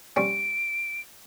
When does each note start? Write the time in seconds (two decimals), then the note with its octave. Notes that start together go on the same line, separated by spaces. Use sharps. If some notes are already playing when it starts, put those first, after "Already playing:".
0.16 G3 C4 C#4 D7